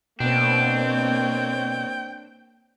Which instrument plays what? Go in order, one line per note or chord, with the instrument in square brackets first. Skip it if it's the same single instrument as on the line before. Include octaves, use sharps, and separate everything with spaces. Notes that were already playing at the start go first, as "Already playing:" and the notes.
[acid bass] B2 [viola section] A#3 C4 C#5 [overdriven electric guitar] D4 [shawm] G5